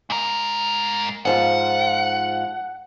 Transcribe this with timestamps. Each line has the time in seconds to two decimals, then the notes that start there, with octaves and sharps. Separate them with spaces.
0.10 G#2 A#4
1.25 G#2 F3 F4 F#5